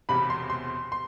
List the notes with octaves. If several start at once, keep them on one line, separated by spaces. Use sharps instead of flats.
E1 E2 C3 B5
C6
C6
C6